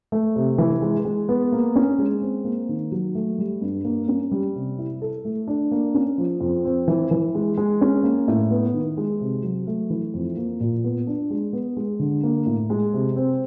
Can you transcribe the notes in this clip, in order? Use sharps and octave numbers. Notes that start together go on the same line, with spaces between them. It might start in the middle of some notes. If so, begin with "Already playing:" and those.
A3
C3
E3
G#3
G#3
B3
A#3
C#4
G#3
C4
A#3
D#3
F#3
A3
G3
G2
A#3
C#4
G3
C3
E4
A4
A3
D4
A#3
C#4
F3
F2
C4
E3
E3
G#3
G#3
C#4
A#3
A2
B3
D#3
G#3
C3
F#3
A3
E3
F2
A#3
A#2
B3
D4
G#3
B3
G#3
D3
A#3
A2
G#3
C3
C4